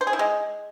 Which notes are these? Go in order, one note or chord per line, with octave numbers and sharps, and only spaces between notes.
C5
G#4
E4
G#3